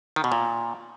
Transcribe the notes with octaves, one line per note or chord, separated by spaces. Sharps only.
D#3
B2
A#2